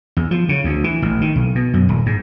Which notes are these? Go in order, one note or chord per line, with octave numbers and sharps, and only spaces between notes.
E2
F3
C#3
D2
E3
A1
D#3
B1
B2
F#2
D#1
G#2